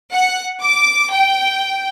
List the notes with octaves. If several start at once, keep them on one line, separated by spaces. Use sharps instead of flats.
F#5
D6
G5